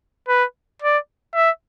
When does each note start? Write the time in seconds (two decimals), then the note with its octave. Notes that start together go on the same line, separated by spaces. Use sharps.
0.28 B4
0.82 D5
1.35 E5